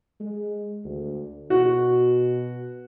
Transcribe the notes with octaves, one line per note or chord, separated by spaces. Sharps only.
G#3
D2
B2 F#4